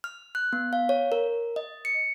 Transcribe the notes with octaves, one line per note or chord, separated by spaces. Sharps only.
F6
F#6
B3
F5
C#5
A#4
D#5
C#7